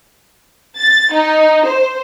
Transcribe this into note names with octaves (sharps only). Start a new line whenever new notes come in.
A6
D#4
C5